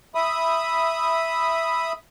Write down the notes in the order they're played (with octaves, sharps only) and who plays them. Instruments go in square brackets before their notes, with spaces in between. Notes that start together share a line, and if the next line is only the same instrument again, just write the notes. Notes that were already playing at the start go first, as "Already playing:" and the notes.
[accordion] E5 B5 D#6